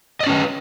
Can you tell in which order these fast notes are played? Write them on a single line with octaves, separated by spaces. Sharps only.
D#5 D5 C#4 B4